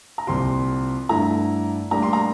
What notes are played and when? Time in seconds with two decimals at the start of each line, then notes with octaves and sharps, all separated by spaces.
0.18 A#5
0.27 C2 A#2 F3 C4 G4 C6
1.09 G2 D3 A3 E4 A#5
1.91 A2 G3 A#3 D4 G4 A#5
2.02 C6
2.13 A#5